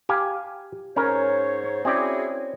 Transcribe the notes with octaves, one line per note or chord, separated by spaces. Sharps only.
G4 F5 G#5
G#2 C#4 A#4 C5 C#5
C4 C#4 E4 F#4 G#4 D5